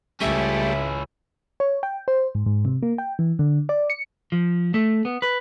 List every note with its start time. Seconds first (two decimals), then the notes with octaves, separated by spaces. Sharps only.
0.21 C#2 G3 A3 C#4 E4 E5
1.60 C#5
1.83 G5
2.08 C5
2.35 G#2
2.46 G#2
2.65 C3
2.83 A#3
2.98 G5
3.19 E3
3.39 D3
3.69 D5
3.90 C#7
4.32 F3
4.74 A3
5.05 B3
5.22 B4